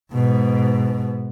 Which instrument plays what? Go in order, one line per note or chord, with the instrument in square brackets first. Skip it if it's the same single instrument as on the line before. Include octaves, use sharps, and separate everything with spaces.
[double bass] G#2 B2